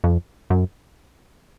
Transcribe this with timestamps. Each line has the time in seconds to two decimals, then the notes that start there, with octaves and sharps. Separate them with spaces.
0.04 F2
0.50 F#2